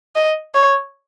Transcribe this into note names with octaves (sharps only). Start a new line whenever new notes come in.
D#5
C#5